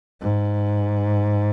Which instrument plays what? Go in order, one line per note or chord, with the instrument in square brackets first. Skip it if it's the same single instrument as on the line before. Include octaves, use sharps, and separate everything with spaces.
[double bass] G#2